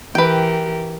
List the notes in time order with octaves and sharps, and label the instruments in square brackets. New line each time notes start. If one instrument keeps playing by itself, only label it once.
[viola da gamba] E3 G4 A#4 [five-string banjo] B4 G5